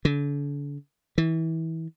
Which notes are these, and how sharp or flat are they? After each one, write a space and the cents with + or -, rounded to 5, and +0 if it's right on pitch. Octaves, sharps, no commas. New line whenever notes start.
D3 -40
E3 -25